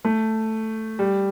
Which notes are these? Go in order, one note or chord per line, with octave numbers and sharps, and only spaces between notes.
A3
G3